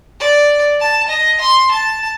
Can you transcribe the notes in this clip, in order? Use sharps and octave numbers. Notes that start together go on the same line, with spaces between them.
D5
A5
D#5
C6
A5